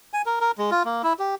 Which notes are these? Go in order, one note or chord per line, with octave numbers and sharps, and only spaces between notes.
G#5
A#4
A#4
G#3
F4
A#3
E4
G4